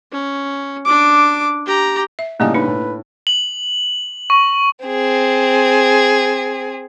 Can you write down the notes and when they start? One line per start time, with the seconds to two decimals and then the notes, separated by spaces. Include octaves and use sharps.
0.12 C#4
0.85 D4 D6
1.66 G4 A#5
2.19 E5
2.40 A2 C#3 G3 A#3 D#4 D5 G#5
2.54 D4 D#4 B4
2.68 A2
3.27 F#7
4.30 C#6
4.86 C4 G#4